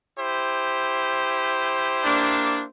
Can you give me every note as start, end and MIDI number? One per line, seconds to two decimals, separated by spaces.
0.17 2.66 64
0.17 2.66 67
0.17 2.66 72
2.04 2.63 58
2.04 2.63 62